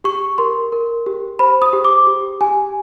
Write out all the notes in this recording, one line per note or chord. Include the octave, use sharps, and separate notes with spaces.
G4 C#6
A#4 C6
A#4
G4
C5 B5
D#6
G4
D6
G4
G4 G#5